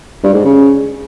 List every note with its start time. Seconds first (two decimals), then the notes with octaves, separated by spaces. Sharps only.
0.24 G2
0.34 G#2
0.45 C#3